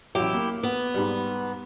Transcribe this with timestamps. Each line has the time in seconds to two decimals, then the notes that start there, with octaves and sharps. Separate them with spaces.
0.15 A1 F#3 E4 G4
0.33 A#3
0.63 B3
0.94 G#2 G3